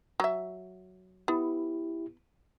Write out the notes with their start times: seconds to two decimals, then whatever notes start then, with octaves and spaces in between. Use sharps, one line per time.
0.20 F#3 E5
1.28 B3 E4 G4